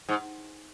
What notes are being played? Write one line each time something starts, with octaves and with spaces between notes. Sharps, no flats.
G#2